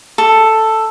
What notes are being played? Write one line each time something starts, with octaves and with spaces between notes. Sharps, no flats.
A4